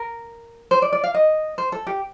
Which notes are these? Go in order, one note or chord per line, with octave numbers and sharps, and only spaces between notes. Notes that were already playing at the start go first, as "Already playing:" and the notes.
Already playing: A#4
C5
D5
D5
F5
D#5
C5
A4
G4